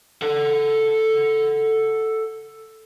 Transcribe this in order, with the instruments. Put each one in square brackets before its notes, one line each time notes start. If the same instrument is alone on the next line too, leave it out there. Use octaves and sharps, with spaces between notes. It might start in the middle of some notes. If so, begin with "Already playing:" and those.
[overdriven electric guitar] A4 F#5